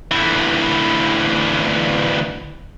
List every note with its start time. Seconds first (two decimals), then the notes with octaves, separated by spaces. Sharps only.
0.12 D2 E3